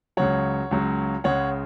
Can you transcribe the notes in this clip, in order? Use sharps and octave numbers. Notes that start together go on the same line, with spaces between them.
C#2 C#3 F#3 C#5 F#5
C#2 C#3 F#3
C#2 C#3 G#3 C#5 F#5